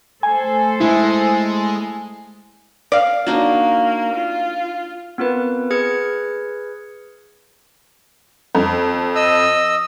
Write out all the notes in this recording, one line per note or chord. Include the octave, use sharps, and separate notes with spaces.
A3 A4 C5 G#5
G#3 E4
D5 F5
A#3 D4 D#4 F#4
F4
B3 C4 F4 A#4 B4
G#4 B4 F6 G#6 C#7
F2
D#5 E6